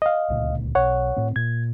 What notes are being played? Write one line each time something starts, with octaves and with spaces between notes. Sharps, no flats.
D#5 F5
D1 C#2 A#2
B1 C#5 F#5
A2 C4
A#2 G#6